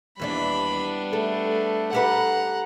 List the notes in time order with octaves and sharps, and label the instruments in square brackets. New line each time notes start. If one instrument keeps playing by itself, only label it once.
[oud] D#2 E3 D5 [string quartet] G3 B3 D4 [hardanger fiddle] B5
[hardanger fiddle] A3 [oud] A4
[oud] G4 A4 B4 [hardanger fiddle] F#5 A#5